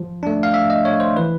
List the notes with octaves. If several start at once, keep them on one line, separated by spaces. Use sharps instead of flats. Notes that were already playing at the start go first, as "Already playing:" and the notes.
Already playing: F3
A3 D4
F5
F3 E5
D#5
A3 D4 C#5
C5
E3 B4